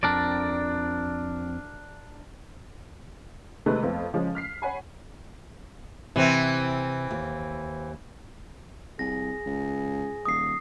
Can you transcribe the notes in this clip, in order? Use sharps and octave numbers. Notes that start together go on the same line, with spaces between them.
F2 D4 A#4 D5
C3 D#3 G#3 A3 B4
F2 A3 B3 C4 F4
C#3 F3 G#3 C#4
F6 B6 C7
C#5 F#5 G#5 B5
C3 E3 C4
D#2
C2 G#4 A#6
C#2
D#1 D#6 C7